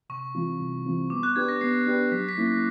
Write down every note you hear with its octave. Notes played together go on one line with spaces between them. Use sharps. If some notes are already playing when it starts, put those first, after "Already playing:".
C3 C#6
E3 G3 C4 F4
C3
E3 G3 C4 F4
B3 D6
F#6
D4 G4 B4 G#6
A#6
B3 C7
D4 G4 B4
F#3 B6
B6
A#3 C#4 E4
A#6